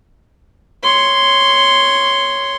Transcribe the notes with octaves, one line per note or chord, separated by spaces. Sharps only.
C#5 C6